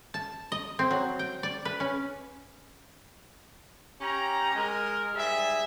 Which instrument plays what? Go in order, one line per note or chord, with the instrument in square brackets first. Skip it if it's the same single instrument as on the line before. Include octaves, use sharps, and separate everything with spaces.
[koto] A5
D#5
C4
F#3
G5
D5
B4
C#4
[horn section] C#4 G4 A#5
G#3 A#4
G#2 G3 G#4 E5